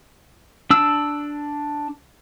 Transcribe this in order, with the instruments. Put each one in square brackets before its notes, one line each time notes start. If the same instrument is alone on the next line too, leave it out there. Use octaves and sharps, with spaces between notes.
[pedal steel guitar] D4 E6